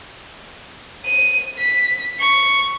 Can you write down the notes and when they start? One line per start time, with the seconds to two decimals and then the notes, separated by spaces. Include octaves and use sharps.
1.05 D#7
1.59 B6
2.20 C#6